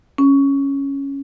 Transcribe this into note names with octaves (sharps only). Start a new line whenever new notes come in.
C#4